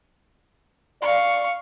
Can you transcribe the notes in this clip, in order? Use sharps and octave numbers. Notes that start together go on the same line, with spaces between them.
D5 F5 C#6